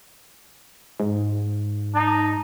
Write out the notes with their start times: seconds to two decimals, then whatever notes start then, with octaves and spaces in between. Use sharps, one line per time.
1.00 G#2
1.94 D#4 A5